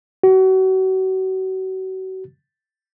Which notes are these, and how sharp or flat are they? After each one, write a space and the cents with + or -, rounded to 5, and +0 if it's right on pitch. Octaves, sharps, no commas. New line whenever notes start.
F#4 +35